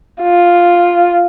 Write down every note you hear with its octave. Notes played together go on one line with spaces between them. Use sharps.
F4